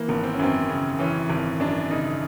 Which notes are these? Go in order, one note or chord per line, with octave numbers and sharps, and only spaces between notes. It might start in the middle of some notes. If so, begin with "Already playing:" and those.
Already playing: E3 A#3
G#1 B3
C4
C#4
F#2 C4
C#3
E3 C#4
G#1
F#2 D4
C#3 D#4